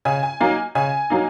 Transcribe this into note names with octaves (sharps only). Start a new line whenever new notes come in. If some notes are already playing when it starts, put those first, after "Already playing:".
C#3 G#5
G#5
F#3 A#3 D#4 G#5
C#3 G#5
F#3 A#3 D#4